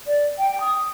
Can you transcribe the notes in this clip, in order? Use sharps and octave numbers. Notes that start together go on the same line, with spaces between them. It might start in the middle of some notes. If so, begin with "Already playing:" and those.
D5
G5
D#6